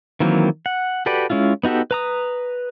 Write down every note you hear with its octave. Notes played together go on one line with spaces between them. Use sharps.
D#3 E3 F#3 A#3 C4
F#5
F#4 G4 A4 B4 D5
G#3 C#4 E4 F4
B3 D#4 F#4 G4 A4
B4 A#5 D#6